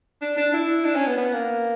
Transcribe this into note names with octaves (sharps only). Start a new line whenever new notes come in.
D4
D4
E4
D4
C#4
B3
B3
A#3